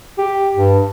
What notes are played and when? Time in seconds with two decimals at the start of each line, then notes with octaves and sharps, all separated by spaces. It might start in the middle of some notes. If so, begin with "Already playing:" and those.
0.18 G4
0.55 G2